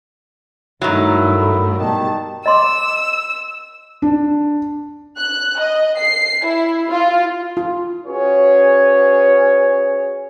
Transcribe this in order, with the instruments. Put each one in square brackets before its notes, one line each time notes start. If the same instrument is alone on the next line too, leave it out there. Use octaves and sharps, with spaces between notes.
[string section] G2 A3 [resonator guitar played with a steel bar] D#3 F#3 [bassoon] E4
[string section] B2 G3 A5 [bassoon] D#3
[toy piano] D#5 C6 D6 [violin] E6
[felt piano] D4
[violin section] F#6
D#5
C7
E4
F4
[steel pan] F4
[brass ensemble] C#4 F#4 G#4 B4 C#5